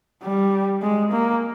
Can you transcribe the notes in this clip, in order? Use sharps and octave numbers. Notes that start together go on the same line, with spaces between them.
G3
G#3
A#3